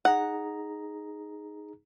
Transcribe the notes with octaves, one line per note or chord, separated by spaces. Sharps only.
D#4 G#4 F#5 A#5